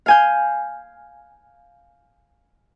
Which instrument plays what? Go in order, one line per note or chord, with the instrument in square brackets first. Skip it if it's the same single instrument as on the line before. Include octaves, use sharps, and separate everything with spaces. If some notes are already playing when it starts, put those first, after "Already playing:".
[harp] F5 G#5 G6